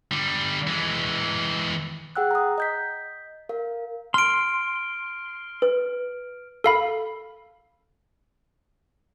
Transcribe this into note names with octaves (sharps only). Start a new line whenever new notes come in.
D3 G3
E3 G#3
G#4 F#5 G5 E6 F#6
A#5 D#6
D#5 G6 B6
A#4 F5
C6 F6 D7
B4
A4 F5 B5